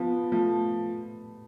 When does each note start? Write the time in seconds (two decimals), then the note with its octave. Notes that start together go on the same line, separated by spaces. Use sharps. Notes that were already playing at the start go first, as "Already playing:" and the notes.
Already playing: F3 B3
0.32 F3 A3